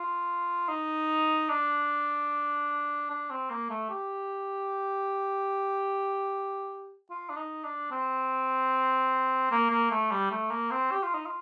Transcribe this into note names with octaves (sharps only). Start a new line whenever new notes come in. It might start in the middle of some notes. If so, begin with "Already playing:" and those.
Already playing: F4
D#4
D4
D4
C4
A#3
A3
G4
F4
D4
D#4
D4
C4
A#3
A#3
A3
G3
A3
A#3
C4
G4
F4
D#4
F4